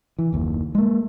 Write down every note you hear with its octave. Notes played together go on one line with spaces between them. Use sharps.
E3
F#1 D#2
G#3 A#3